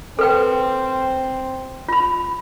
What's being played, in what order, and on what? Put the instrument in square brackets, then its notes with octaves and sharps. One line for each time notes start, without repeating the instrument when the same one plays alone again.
[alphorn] C4 [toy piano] A4 B4 G5
[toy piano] F4 B5